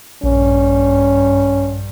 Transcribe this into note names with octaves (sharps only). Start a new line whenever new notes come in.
A#1 G2 C#4